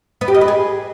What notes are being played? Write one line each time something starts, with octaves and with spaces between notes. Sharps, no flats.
B3
G4
D#5
B4
G#4